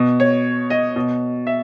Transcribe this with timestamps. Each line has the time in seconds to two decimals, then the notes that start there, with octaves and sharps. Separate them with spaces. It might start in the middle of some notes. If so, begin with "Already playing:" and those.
Already playing: B2
0.20 C#5
0.70 D#5
0.96 B2
1.47 E5